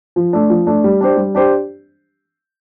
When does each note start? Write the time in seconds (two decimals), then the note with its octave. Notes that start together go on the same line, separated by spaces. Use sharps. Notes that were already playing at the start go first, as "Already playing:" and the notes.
0.16 F3
0.33 A3 D4
0.50 F3
0.67 A3 D4
0.84 G3
1.01 D4 G4 C5
1.17 G3
1.35 D4 G4 C5